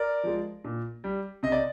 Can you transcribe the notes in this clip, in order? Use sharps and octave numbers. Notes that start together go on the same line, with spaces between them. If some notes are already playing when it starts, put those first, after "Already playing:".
Already playing: A#4 D5
F3 G#3
A#2
G3
C3 D#5
D5